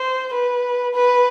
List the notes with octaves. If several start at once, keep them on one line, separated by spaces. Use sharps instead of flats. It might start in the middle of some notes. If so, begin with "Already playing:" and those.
Already playing: C5
B4
B4